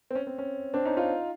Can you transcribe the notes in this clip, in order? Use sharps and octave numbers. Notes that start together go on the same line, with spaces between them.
C4
C#4
C4
C#4
C4 D4
C#4 D#4
D#4 F4